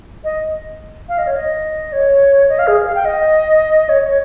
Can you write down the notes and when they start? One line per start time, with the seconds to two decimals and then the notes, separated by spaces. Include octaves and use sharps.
0.24 D#5
1.09 F5
1.18 D#5
1.27 C#5
1.36 D#5
1.93 C#5
2.49 D#5
2.59 F5
2.67 G#4
2.87 F5
2.95 G5
3.05 D#5
3.89 C#5
4.08 C#5